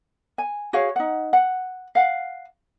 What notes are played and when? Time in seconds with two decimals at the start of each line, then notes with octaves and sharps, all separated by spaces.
0.38 G#5
0.73 F#4 G#4 C#5 F5
0.96 D#4 F#5
1.33 F#5
1.95 F5 F#5